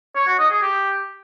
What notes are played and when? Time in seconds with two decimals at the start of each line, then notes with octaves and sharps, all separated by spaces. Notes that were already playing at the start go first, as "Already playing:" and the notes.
0.16 C#5
0.27 F#4
0.39 D#5
0.51 G#4
0.62 G4